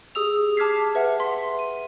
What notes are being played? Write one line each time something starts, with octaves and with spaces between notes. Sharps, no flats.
G4 G#4 D#6 E6 F7
A5 D6 F6 G#6 B6 C7
B4 E5 F#5
C6 B6
D#7